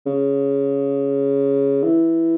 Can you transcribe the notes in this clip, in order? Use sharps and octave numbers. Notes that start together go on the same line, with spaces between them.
C#3
E3